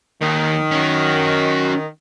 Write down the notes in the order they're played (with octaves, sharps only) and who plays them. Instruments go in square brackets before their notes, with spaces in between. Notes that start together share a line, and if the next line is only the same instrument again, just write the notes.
[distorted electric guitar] D#2 [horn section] D#3
[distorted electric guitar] C#4 F#4